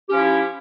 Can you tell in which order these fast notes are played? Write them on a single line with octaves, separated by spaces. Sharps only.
G4 C#4 F3 E4